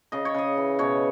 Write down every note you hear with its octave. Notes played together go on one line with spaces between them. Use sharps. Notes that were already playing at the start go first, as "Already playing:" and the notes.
C#3 D#5
C#5
C#3 D#5
E3
B2 C#5